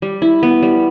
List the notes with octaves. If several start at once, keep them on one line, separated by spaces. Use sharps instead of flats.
G3
E4
B3
G3